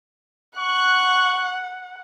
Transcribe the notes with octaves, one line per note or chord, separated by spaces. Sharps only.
F#5 C#6 F#6